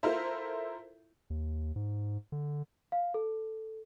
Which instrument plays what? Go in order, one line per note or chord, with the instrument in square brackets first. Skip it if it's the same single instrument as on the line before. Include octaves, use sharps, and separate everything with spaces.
[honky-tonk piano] E4 F4 A4 A#4 C5 E5
[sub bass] D#2
G#2
D3
[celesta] F5
A4